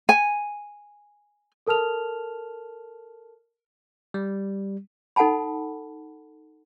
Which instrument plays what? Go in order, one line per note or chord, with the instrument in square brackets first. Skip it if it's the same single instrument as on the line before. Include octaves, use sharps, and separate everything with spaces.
[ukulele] G#5
[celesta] A4 A#4 A5 F6 F7
[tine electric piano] G3
[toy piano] D#4 A4 F#5 G#5 A5 B5